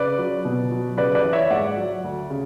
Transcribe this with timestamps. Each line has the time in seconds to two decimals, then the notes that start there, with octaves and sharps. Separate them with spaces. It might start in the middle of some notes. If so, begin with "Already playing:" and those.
Already playing: C#3 B4 D5
0.19 F#3
0.45 B2
0.71 F#3
0.98 C#3 B4 D5
1.15 B4 D5
1.24 E3
1.33 C#5 E5
1.50 G#2 D5 F#5
1.77 F#3
2.04 D2
2.30 C#3